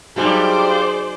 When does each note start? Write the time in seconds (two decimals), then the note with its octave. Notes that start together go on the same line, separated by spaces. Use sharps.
0.16 G2 F#3 G3 D#4 G#4 C5 D5 G#5